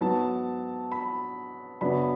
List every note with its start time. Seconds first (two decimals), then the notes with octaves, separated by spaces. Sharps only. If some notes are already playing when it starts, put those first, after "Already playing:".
0.01 G#2 F#3 B3 A5
0.92 B5
1.81 F#2 C#3 F#3 B3 D4 B5